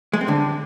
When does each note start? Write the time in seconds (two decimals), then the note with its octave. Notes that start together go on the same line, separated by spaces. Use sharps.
0.13 G#3
0.21 C4
0.28 D3